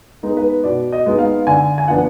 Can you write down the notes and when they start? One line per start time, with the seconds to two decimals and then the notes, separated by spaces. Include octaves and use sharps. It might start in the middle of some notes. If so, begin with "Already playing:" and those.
0.23 G#3 B3 D#4
0.37 B4
0.64 B2 D5
0.92 D#5
1.06 G#3 B3 D#4
1.19 F5
1.47 D3 G#5
1.78 G#5
1.88 F3 B3 D4 F4 F#5